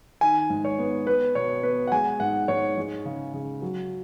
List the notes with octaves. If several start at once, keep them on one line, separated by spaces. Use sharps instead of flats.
D#3 G#5
G#2
C#5
B3
B3 B4
B2 C#5
B3 B4
F#5
G#3 G#5
G#2 F#5
G#2 C#5
G#3
C#3
C#3
F#3